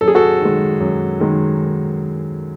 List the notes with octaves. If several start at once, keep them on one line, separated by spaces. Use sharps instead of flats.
F#2 A4
G#4
F#4 A4
D#3 G#3
F#2
D#3 G#3